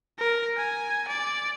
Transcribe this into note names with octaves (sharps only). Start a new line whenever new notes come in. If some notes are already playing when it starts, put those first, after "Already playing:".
A#4
G#5
D5